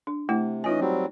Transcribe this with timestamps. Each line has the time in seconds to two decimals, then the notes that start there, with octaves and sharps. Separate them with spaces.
0.07 D4
0.29 C3 A3 E4 G5
0.64 E3 C#4 D#4 F4 D#5 G#5
0.80 F#3 G3 C4